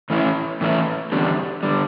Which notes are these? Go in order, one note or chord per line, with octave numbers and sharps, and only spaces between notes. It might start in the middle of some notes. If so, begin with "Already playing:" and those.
A2 E3 A3 C#4 E4
A2 E3 A3 C#4 E4
E2 D3 G3
D3 G3